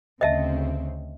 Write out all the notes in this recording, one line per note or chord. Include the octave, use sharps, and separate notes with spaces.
D2 C#3 C4 D#5 E5 A5